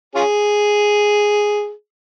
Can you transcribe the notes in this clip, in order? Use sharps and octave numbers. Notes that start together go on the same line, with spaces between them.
C#4 F4 G#4